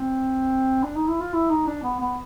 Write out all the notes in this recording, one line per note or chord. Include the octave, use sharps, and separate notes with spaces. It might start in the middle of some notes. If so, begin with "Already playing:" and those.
Already playing: C4
D4
D#4
E4
F4
E4
D#4
D4
B3
B3